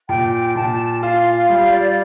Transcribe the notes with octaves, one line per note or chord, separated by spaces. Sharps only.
A#2 G5
A#2 A5
F4 F5
F5
G3 F5
D5